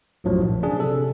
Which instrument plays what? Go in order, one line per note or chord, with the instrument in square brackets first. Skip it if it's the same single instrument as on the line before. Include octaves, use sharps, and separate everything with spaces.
[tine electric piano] B1 F#2 A2 F3 F#3
A#1
C#3 D4 G#4
C3 A4